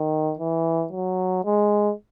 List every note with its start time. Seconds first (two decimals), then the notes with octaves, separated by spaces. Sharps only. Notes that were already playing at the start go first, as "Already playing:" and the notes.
Already playing: D#3
0.39 E3
0.92 F#3
1.45 G#3